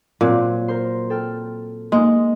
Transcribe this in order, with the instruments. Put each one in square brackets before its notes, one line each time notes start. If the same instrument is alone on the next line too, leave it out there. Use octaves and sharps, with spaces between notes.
[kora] A#2 [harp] F#3 C4 F#6
[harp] A#4 C5 C6
A4 G5 F6
[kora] G#3 [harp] A#3 D#4